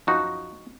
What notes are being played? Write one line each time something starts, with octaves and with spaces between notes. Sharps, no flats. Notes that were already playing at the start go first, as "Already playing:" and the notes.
F#2 F3 D#4 F#4